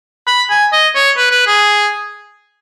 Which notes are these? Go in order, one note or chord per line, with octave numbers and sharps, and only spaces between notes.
B5
G#5
D#5
C#5
B4
B4
G#4